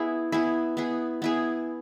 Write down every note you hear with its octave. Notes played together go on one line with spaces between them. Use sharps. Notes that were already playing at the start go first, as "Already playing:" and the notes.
Already playing: B3 E4 G#4
B3 E4 G#4
B3 E4 G#4
B3 E4 G#4